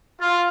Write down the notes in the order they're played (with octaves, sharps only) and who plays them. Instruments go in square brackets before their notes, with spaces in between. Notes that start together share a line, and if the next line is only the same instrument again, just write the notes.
[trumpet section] F4